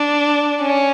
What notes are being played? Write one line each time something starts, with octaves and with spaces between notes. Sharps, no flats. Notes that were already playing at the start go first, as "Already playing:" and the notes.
Already playing: D4
C#4